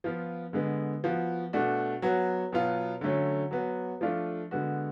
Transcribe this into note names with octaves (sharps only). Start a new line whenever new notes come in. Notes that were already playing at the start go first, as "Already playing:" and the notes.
F3 B3 F4
D3 G#3 B3
F3 B3 F#4
B2 A3 D4 F#4
F#3 B3 F#4
B2 F#3 B3 F4
D3 F#3 A3 C#4
F#3 B3 F#4
F3 A3 D4 F4
D3 G#3 B3 F#4